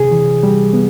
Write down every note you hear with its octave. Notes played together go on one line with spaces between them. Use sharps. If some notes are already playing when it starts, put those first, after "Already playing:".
Already playing: C3 G#4
E3
G3
B3